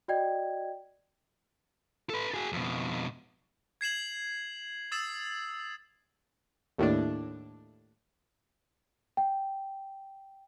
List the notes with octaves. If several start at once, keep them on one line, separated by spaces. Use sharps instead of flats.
F#4 D5 D#5 G5 G#6
A4 B4
F#4 G#4
F2 B2
G#6 C7 E7 F#7
D#6 E6 A6 C7 E7
D#2 A2 D4
G5